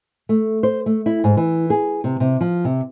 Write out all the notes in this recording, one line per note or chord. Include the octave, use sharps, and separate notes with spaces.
A3
C5
A3
E4
G#2
E3
G#4
C3
C3
F3
C3